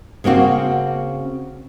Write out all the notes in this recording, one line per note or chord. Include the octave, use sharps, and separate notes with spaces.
C#3 A#3 C4 F#4